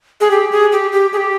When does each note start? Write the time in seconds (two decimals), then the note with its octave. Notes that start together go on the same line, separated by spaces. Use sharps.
0.21 G#4
0.31 G4
0.52 G#4
0.72 G4
0.92 G4
1.13 G#4
1.17 G4